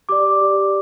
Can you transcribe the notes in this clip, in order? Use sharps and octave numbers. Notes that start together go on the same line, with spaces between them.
G4 D5 D6
G4 D5